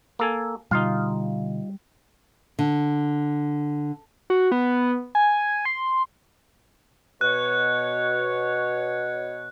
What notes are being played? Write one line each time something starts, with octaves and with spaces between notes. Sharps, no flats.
A#3 A4 G#5
B2 D3 G3 D#4 F4 F5
D3
F#4
B3
G#5
C6
B2 C#5 F#6